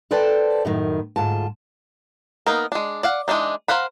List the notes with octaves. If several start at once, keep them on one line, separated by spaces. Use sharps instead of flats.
A4 B4 C5 D5 G5 A5
F#2 A2 D#3
D2 G#2 F4 A5
A#3 B3 D#4 A#4
G#3 D4
D5 F5 F#5
E3 G#3 A3 D4 D#4
A#4 C5 F5 F#5 B5